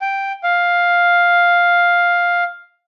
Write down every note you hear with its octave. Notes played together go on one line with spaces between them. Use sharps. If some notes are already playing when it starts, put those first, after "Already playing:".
G5
F5